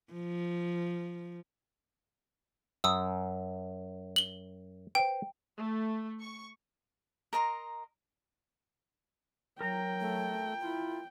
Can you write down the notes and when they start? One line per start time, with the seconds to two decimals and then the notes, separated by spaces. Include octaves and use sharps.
0.13 F3
2.84 F#2 D#6 E6
4.16 F#7 G7
4.95 B4 C5 G5
5.58 A3
6.21 C#6
7.33 A#4 D#5 A#5 C6
9.61 F#3 A#4 G5 A#5
10.00 A3
10.60 E4 F4